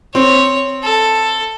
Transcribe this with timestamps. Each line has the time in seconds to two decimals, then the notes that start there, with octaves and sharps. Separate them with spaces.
0.15 C4 C#5
0.83 A4